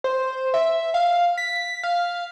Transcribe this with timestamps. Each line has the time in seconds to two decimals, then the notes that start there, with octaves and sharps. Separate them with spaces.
0.04 C5
0.54 E5
0.94 F5
1.38 B6
1.83 F5